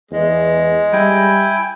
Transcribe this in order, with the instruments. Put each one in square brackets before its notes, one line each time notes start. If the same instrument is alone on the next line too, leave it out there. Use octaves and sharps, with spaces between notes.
[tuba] E2 [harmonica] G#3
[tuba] G3 [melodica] E4 G5 G#5